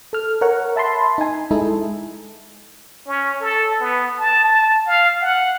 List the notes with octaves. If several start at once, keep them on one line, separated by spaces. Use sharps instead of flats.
A4 F6
A#4 C#5 F#5
E5 A5 B5 C6
D#4 G#5
G#3 D#4 E4 A4
C#4
A4
B3
A5
A5
F5
F#5